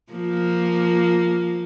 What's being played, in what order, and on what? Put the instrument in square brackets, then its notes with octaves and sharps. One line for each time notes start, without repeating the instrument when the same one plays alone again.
[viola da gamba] F3 A#3